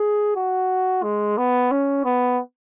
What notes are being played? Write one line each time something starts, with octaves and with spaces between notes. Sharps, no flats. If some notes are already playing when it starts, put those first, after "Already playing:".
Already playing: G#4
F#4
G#3
B3
C#4
B3